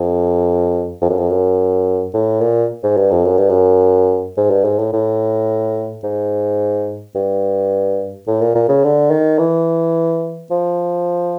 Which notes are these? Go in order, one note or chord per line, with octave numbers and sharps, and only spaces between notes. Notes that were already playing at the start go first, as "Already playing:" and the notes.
Already playing: F2
F2
F#2
F2
F#2
A2
A#2
G#2
G2
F2
F#2
G2
F#2
G#2
G2
G#2
A2
A2
G#2
G2
A2
A#2
A#2
C#3
D3
D#3
E3
F3